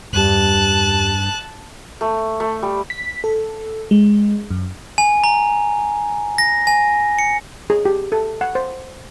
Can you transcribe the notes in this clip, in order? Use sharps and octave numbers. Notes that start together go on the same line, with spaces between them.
E2 G2 G4 A5 F#6
A3
A3
G3
B6
A4
G#3
F#2
G#5
A#5
A#6
G#5
C#7
G#4
G4
A4
F#5
C5